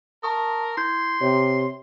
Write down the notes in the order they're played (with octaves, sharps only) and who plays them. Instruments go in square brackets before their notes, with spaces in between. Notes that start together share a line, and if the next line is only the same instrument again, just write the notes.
[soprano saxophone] A#4 [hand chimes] A5 C#6 D#6
[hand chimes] E4 G6 G#6 [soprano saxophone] C6
[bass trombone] C3 [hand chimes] C#5